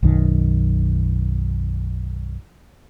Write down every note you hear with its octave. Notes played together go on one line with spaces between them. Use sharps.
B1 F#2 D#3